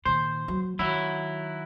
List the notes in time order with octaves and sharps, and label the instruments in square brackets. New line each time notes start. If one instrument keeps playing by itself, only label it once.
[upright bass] A#2 D#3 [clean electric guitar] C5
[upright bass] F#3
[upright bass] D#3 [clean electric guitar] F#3 E4